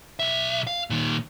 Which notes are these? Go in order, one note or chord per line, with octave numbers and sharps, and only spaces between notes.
B1 E5
F5
A#2 D#3